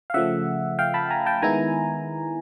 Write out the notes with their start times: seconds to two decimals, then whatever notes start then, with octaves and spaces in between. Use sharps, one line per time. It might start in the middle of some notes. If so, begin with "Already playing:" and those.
0.10 F5
0.14 C#3 F3 A3 E5 F#5
0.79 F5 G5
0.94 A5 B5
1.10 G#5 A#5
1.26 G5 A5
1.42 D#3 G#3 B3 E4 G#5 A#5